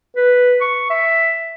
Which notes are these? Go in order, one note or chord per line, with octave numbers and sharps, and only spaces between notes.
B4
C#6
E5